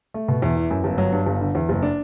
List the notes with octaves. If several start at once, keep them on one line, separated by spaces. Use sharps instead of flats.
A3
B2
E2
E3
F#2
G1
F#3
G2
G1
D3
E2
F#1
D4